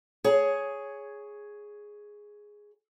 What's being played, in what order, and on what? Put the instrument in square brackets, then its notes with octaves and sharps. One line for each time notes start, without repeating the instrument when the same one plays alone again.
[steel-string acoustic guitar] G#4 C#5